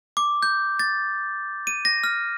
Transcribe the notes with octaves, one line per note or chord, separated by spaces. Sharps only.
D6
G6
A6
D#7
A#6
F6